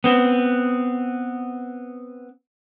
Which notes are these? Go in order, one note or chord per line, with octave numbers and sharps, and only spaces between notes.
B3 C4